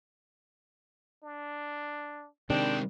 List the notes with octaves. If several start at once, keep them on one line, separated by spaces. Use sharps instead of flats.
D4
C3 D#3 G#3 C4 D4 G5